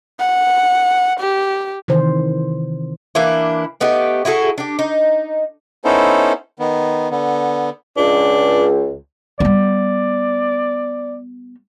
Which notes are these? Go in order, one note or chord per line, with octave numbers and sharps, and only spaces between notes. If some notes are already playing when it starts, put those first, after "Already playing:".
F#5
G4
C3 D#3 E3 C5
E3 A#3 D4 E4
A3 B3 D#4 G4
E4 F#4 G#4 A4
D4 G4
D#4
B3 C#4 D#4 E4 A4 C5
D#3 B3
D3 B3
C#2 D4
G3 B3 D5